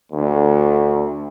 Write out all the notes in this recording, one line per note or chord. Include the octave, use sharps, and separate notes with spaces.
D2